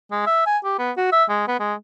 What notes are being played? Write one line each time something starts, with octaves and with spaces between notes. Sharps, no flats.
G#3
E5
G#5
G4
B3
F#4
E5
G#3
B3
G#3